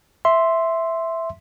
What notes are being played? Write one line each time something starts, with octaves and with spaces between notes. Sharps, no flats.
E5 C6